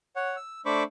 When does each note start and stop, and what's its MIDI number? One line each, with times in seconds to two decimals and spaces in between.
0.16 0.36 73
0.16 0.36 78
0.36 0.61 88
0.66 0.83 57
0.66 0.83 62
0.66 0.83 72
0.66 0.83 83
0.66 0.83 85
0.66 0.83 86